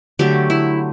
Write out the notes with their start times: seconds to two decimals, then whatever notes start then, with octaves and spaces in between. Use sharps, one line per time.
0.19 D3 F#3 A3 G4
0.50 E4